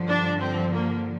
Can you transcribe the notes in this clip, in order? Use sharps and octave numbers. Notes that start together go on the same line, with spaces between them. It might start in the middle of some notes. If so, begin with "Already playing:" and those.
Already playing: G2 D3 F3
D4
C4
A#3